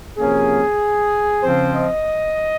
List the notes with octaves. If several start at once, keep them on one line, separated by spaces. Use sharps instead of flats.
C3 F3 A#3 C#4 G#4
C#3 F3 C4 C5
D#5